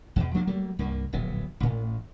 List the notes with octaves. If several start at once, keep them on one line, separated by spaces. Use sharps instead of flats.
E2 B2
F3 A#3 D4
F#3 G3 A3 A#3
C2 G2 A#3
D1 A#1 F#3 B3
A1 A2